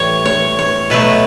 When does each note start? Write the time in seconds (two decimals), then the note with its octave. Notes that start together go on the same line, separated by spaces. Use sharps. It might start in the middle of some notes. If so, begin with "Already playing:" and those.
Already playing: A2 E3 G3 C#5
0.26 C#5
0.59 C#5
0.90 B2 F#3 A3 B4